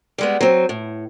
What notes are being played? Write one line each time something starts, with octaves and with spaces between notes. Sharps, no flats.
G3 G#3 B3
F#3 C4
A2